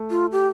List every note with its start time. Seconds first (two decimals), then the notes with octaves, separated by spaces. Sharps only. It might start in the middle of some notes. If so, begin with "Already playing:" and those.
Already playing: A3
0.11 F4
0.32 G4